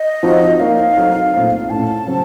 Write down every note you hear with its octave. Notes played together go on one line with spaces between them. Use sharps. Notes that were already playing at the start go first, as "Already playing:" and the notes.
Already playing: D#5
F3 C4 D#4 F#4
A#3 D#4 A#4 C#5 F5
F#3 C4 D#4 F#4 A4
A#2 A3 C4 D#4
A2 A3 C#4 A5
C#3 F#3 C4